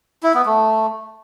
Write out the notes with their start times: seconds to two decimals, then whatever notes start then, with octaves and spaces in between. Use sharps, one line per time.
0.23 E4
0.34 B3
0.46 A3